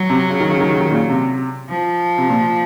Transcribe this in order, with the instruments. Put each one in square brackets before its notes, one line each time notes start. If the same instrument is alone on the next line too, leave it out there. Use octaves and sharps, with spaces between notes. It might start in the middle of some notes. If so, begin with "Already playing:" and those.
Already playing: [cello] F#3
[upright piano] C3
C#3
D#3
C#3
D#3
C#3
D#3
A#2 C#3
C3
[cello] F3
[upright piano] C3
A#2